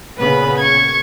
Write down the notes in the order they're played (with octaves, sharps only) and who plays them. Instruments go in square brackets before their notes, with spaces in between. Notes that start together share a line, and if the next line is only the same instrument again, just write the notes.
[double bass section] A#2 C#3 B3 [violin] B4 B5
[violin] C#6 G#6